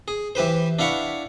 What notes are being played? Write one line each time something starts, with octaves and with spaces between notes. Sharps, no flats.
G#4
E3 G4 B4 C5
D4 E4 F5 F#5 B5 C#6